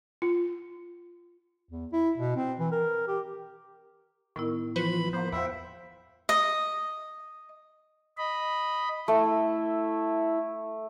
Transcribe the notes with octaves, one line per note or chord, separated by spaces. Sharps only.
F4
E2
E4
B2
C4
E3
A#4
G4
A2 D#3 B3 E4
E3 F3 F4 B4 C5 B5 C#6
F3 A#3 B3 C5
E2 F4 C5 E5 F#5 G5 B5
D#5
D#5 B5
A3 E4